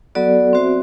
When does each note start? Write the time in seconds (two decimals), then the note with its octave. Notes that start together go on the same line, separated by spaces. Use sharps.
0.15 F#3 B3 F#4 A4 D5
0.53 C4 F#4 C5 E5